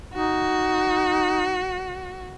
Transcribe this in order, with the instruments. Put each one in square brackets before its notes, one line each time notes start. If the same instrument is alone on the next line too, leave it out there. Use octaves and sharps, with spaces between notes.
[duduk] D#4 [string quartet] F#4